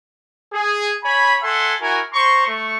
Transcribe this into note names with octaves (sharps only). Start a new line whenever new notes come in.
G#4
C#5 G#5 B5
A4 E5 F#5 G#5 C6
E4 F#4 A#4 G#5
C5 A#5 C6 C#6
A3 C#6